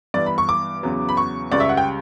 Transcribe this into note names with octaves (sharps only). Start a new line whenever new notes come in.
G2 E3 B3 D5
B5
C#6
D6
E2 C#3 F#3 B3
B5
C#6
C#2 C#3 G3 D5
E5
F#5
G5